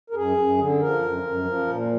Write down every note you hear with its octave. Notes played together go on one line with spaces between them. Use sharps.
A#4
F#2 G#4
F#2
D3
F3 A#4
F#2
F#2
F3
A#2